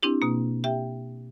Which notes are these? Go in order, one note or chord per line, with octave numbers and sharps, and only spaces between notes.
C4 D4 E4 G4
B2 A#3
G4 E5 G5